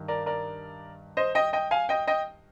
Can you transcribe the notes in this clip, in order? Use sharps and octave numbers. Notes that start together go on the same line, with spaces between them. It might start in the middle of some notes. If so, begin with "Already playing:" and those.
Already playing: G2 D#3
A#4 D5
A#4 D5
C5 D#5
D#5 G5
D#5 G5
F5 G#5
D#5 G5
D#5 G5